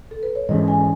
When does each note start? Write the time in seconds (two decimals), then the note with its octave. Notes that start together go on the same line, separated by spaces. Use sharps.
0.11 A4
0.23 B4
0.35 C#5
0.49 G#2 E3 G#3 C#4 D#5
0.68 G#5